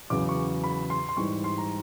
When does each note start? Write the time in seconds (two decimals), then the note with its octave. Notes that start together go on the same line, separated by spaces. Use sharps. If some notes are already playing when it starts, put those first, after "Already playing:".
0.10 E2 C#3 F#3 D6
0.29 C#6
0.64 B5
0.90 C6
1.09 C6
1.17 G#2 E3 G3 C#6
1.44 C6
1.58 A#5